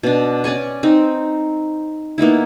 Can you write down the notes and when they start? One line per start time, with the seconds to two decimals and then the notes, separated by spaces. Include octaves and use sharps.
0.03 B2 D4
0.44 C#4 D5 G#5 C#6
0.83 C4 D#4
2.18 A#3 B3 D#4 E4